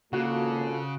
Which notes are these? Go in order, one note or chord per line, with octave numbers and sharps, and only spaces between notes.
G#1 C#3 A#3 F4 F#4 A4